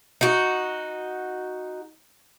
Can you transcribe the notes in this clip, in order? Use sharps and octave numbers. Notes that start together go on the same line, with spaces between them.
D#4 F#4